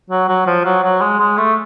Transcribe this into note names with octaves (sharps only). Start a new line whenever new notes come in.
F#3
F#3
F3
F#3
F#3
G#3
G#3
A3